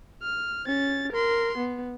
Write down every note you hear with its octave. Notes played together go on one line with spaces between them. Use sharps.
F6
C#4 A6
A#4 C6
B3